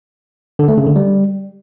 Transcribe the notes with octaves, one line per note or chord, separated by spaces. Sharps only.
D3
A3
C#3
D3
G3